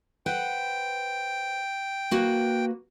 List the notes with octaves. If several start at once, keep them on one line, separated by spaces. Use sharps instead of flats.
B4 C5 F#5 G5
A#3 F#4 B4